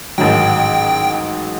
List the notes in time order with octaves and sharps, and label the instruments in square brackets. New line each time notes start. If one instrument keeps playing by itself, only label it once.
[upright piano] A1 G#2 D#3 F#3 [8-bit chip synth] G5